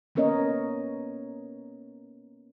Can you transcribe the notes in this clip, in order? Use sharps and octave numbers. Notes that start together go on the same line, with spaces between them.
A#3 B3 C#4 A#4 C#5 D#5